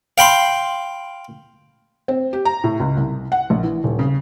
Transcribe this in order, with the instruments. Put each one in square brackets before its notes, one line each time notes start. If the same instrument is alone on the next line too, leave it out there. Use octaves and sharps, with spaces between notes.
[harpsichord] F5 G5 B5 C6
[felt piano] C4
G4
A#5
A2
C#2
C2
F#5
A#1
E3
D#1
C#3